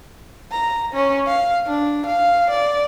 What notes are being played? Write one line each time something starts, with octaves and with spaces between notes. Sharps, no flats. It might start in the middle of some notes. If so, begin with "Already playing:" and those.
A#5
C#4
F5
D4
F5
D5